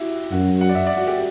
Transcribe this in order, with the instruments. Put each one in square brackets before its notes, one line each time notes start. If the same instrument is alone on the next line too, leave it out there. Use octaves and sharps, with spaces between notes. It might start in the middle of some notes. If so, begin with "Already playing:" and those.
Already playing: [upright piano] E4 F#4 G4
[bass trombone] F#2 [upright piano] F#4
[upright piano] F#5
D5
E5
D5
F#4
G4